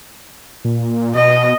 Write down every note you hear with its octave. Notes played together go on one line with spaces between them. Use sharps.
A#2
B2 D#5